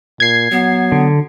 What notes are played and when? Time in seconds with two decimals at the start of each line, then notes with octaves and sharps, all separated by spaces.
0.20 A#2 G#6 C7
0.51 F#3 B3
0.92 D3